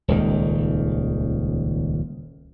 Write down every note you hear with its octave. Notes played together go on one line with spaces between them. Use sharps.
D#1 C#2 D#3